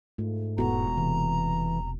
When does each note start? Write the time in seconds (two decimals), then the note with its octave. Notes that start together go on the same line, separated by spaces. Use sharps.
0.18 G#2 A3 F4
0.58 E1 B3 E4 F#4 A4 A#5
0.98 C3 E3